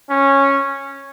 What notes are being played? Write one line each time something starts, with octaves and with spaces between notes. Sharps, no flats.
C#4